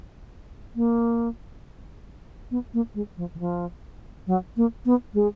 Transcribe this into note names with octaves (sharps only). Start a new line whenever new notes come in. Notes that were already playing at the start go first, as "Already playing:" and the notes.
A#3
B3
A#3
G#3
F3
D#3
F3
F#3
A#3
B3
G#3